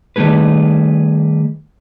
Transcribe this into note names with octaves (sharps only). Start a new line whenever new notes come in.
D#3 G3 A3 G#4 B4